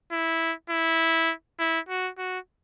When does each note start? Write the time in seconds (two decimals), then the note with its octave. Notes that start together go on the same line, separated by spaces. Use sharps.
0.11 E4
0.70 E4
1.59 E4
1.89 F#4
2.18 F#4